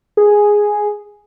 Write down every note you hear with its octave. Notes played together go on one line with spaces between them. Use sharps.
G#4